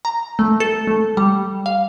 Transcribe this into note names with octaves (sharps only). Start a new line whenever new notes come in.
A#5
A3
A4
A3
G3
F5